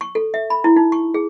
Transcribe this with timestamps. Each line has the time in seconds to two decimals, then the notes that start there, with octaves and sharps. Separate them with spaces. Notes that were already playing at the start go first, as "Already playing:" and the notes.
0.01 C#6
0.15 A4
0.34 E5
0.50 B5
0.64 E4
0.76 D#4
0.92 C#6
1.14 G#4